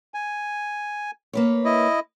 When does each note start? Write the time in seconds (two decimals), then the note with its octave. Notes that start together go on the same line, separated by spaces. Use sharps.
0.14 G#5
1.33 A#3 B4 C#5
1.65 E4 D#5